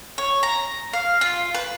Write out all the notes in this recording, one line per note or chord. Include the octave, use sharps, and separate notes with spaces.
C#5
A#5
F5
F4
B4